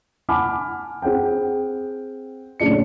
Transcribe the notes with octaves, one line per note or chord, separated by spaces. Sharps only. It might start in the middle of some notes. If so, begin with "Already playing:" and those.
F#5 G#5 A5 B5 D6 F6
C4 G#4 F#5 G5
F#1 A2 C#3 D4 C#7